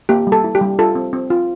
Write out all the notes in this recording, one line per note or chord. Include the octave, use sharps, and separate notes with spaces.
A#3 G4
G3
A4
E4
G4
G3
F4 A4
C4
C4
F4